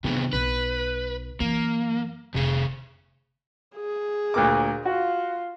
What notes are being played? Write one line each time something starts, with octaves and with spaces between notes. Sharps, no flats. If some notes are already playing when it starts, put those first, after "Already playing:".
G2 C3 D#3 B3 G#4
B1 B4
F#2 E3 A#3
F1 C3 G#4
G#4
D2 A#2 D6
F4 F#4